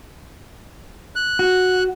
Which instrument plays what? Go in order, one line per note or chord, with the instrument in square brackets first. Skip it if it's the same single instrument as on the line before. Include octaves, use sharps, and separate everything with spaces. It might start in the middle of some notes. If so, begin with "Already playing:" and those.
[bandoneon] F#6
[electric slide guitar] F#4